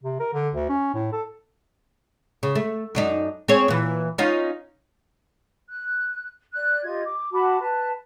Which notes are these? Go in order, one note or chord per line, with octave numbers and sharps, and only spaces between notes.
C3
A#4
D3
D2
C#4
A2
A4
C#3
A3
F#2 D4 D#4
C4 G#4 C#5
A#2 E3
C#4 D#4 F4
F#6
D5 F#6
F4 G4 D#5 G#6
D6
F#4 A5 B5 D6
B4 A5